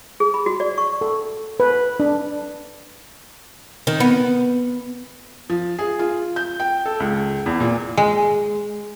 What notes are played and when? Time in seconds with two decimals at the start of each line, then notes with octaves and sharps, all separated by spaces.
0.20 G#4
0.34 B5
0.46 F#4
0.60 D5
0.78 C#6
1.01 A4
1.60 B4
2.00 D4
3.87 D#3
4.00 B3
5.50 F3
5.79 G#4
5.99 F4
6.36 G6
6.60 G5
6.86 A4
7.00 C#2
7.46 E2
7.60 A#2
7.97 G#3